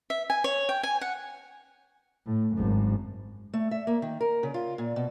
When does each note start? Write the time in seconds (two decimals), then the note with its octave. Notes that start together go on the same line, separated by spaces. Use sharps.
0.10 E5
0.30 G#5
0.44 C#5
0.69 G5
0.83 G#5
1.01 F#5
2.26 A2
2.56 G#1 F#2
3.53 A3
3.71 E5
3.87 A#3
4.02 D#3
4.21 A#4
4.43 C#3
4.54 F4
4.78 A#2
4.96 B2